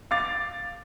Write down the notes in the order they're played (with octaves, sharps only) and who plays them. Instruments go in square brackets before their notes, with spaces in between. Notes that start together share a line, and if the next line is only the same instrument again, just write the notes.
[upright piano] F5 D6 A6